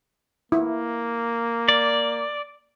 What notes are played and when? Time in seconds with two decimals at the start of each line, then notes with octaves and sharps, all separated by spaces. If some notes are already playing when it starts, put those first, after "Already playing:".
0.52 A#3 E4
1.68 D5